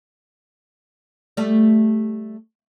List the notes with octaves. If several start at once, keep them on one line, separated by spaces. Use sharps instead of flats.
G3 A3